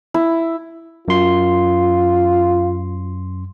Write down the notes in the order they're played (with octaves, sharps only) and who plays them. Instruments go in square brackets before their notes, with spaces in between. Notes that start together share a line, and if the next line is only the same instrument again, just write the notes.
[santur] E4
[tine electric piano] F#2 C6 [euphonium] F4